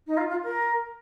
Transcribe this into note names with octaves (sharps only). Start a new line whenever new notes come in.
D#4
F4
F4
A#4